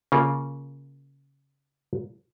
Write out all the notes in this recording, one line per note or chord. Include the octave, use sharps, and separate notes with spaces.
C#3 A#3 F4 A#4